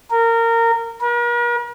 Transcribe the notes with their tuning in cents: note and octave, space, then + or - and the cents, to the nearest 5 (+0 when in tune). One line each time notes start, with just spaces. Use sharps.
A#4 -20
A#4 +45